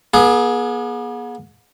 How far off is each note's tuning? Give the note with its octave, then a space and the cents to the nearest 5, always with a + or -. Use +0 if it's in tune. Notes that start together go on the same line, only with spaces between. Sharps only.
B3 -40 G#4 +15